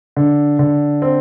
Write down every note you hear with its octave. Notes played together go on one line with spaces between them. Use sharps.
D3
D3
C4